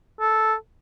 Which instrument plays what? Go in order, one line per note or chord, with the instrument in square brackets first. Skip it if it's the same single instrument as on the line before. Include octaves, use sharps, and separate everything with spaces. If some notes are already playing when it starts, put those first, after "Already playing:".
[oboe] A4